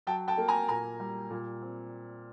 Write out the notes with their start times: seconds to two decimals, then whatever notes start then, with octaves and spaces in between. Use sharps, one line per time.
0.07 F#3 G5 A5
0.28 G5 A5
0.38 A#3
0.48 G#5 A#5
0.68 A#2 G#5 A#5
1.00 G3
1.30 A#2
1.61 C4